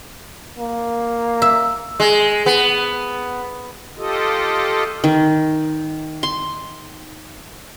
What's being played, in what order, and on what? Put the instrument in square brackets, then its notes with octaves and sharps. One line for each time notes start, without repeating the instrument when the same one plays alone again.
[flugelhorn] A#3
[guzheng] E5
[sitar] G#3
B3
[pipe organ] F4 G4 A4 D#5
[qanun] D#3
C6